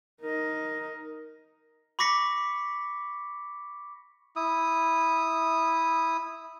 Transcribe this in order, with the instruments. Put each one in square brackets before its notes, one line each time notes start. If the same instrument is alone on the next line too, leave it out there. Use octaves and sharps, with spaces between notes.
[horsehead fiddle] D#4 D#5 [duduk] A#4
[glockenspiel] B5 C#6 D6 A#6 B6 C#7
[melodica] E4 D#6